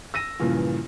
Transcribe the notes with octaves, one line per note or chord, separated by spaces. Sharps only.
E6 A#6 D#7
G2 A#2 C#3 E3 F3